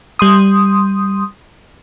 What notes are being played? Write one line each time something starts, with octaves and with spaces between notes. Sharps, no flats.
G3 C6 D#6